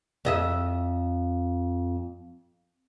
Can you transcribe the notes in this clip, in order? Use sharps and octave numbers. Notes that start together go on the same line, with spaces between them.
F2 D#5 E5